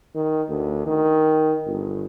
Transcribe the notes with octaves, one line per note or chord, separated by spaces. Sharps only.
D#3
D2
D#3
G1